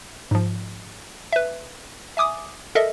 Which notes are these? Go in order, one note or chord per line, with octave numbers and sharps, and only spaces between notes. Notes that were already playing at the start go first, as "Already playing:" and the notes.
G#2 F3
B4 E5
E5 G#5 D6 D#6
A4 A#4 D#5 E5